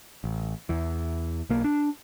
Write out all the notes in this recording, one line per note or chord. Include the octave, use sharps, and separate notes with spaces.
A1
E2 E3
B1 A#3
D4